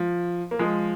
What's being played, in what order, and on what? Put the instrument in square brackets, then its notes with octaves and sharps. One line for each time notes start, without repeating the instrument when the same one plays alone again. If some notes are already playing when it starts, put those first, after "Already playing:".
Already playing: [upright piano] F3
A#3
F3 G#3